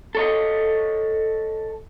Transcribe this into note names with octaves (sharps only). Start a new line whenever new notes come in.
A4 C#5 D#5